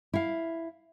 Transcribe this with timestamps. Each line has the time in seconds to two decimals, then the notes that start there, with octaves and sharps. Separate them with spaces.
0.14 E4 F5